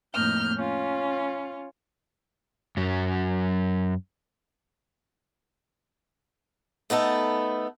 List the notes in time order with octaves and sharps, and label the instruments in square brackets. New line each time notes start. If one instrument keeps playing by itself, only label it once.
[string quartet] F2 A2 A#3 D#4 F6 G6
C#4 F4
[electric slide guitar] F#2 F#3
[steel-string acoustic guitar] A3 B3 D#4 A4